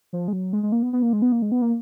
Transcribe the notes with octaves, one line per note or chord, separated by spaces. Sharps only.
F3
G#3
F#3
G#3
G#3
A#3
B3
B3
A#3
G#3
B3
A#3
G#3
B3
A#3